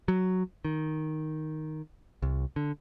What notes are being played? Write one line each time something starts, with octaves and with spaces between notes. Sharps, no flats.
F#3
D#3
C2
D3